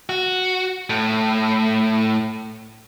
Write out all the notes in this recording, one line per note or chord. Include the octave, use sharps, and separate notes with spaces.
F#4
A2